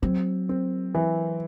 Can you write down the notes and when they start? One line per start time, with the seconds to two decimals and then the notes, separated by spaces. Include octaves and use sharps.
0.02 F#3 C4
0.49 C4
0.94 E3